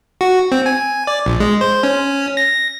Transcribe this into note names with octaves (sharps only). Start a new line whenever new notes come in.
F#4
C4
G#5
D5
A#1
G#3
C5
C#4
A#6